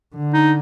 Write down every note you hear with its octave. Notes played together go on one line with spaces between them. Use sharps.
D3
D#4